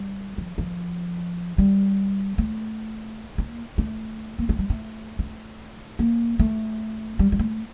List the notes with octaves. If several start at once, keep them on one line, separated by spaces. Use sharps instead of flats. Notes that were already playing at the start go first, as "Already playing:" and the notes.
Already playing: G3
F3
F3
G3
A3
A#3
A3
A#3
A3
G3
A3
A3
A#3
A3
G3
G3
A3